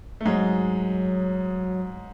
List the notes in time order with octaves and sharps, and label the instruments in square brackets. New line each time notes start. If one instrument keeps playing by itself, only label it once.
[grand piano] A3
[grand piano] G#2 G#3 [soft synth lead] F#3